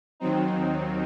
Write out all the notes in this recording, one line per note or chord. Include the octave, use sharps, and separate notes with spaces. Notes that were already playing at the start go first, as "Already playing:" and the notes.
D#2 D#3 F#3 C4 D#4